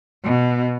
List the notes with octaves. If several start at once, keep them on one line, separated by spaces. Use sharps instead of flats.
B2